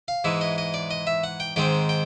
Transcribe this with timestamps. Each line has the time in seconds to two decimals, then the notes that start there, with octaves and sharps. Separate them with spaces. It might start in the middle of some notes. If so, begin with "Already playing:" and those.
0.08 F5
0.24 G#2 E3 G#3 E5
0.41 D#5
0.58 D#5
0.74 D5
0.91 D#5
1.07 E5
1.24 F#5
1.40 G5
1.56 G#2 D#3 G#3 C4 G5
1.89 G5